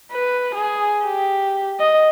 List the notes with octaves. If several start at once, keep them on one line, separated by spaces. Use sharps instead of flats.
B4
G#4
G4
D#5